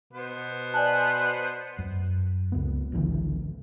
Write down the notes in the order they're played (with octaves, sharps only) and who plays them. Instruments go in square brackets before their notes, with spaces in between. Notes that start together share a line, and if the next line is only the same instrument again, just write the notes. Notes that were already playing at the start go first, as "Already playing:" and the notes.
[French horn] B2 [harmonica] B3 C5
[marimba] D5 G#5 A5 [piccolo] F#6
[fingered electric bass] F#2
C#2 B3
G#1 C#2 D3 E3